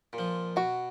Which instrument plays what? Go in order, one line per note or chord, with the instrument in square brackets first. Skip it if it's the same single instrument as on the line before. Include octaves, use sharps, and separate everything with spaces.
[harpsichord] A#2
F3
[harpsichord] B2 [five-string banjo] F#4